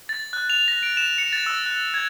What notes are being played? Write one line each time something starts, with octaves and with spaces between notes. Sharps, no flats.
A6
F#6
F7
A#6
D7
E7
C#7
A6
E6
F#6
G#6